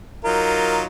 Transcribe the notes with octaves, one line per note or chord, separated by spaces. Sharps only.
F#3 D#4 F4 A#4